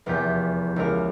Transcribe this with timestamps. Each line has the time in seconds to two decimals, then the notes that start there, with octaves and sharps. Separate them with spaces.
0.06 F1 E2 G4 A#5 G6 B6
0.76 C#2 E4 A#4